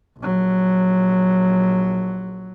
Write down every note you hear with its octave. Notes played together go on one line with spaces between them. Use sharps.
A#1 F#3